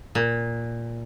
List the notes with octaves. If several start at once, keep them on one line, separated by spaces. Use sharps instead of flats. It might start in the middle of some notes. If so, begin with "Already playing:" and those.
A#2